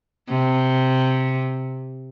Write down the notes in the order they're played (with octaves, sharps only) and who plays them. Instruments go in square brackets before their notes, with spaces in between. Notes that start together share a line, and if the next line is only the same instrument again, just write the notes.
[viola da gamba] C3